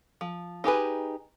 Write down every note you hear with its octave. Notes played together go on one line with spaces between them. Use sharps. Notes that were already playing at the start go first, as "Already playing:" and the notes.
F3
D#4 G4 G#4 B4